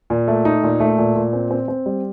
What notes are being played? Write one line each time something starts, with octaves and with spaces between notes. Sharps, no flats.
A#2
A3
D#4
A#2
A3
A#2
A#2
C4
C4
C4
G3